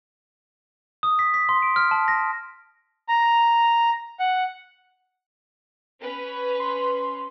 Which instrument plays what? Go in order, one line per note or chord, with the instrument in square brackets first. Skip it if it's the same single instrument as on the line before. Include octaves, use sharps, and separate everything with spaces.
[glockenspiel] D#6
B6
B6
C6
D7
F6
A5
A#6
[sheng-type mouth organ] A#5
F#5
[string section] C#4 B4
[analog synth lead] C6